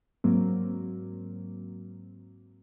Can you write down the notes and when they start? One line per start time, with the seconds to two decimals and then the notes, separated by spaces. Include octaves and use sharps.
0.24 G#2 F#3 A#3 C4